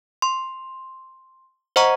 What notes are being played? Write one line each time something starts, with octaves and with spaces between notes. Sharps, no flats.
C6
C5 D#5 F#5 A#5 C#6